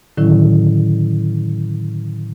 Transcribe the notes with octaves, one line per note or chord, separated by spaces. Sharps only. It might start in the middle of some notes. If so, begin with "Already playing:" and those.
A2 D3 D#3 F#3 C#4 E4